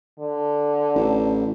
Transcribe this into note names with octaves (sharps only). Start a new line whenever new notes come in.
D3
A1